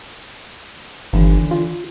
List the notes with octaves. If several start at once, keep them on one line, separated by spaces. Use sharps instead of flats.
G1 D#2 D3 E3
F4